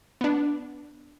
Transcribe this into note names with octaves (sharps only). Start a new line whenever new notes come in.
B3 D4